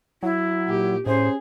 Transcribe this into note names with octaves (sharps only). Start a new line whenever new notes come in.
F#3 E4
A#2 G4
A2 C#4 G#4 C5